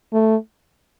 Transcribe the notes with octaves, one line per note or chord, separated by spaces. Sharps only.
A3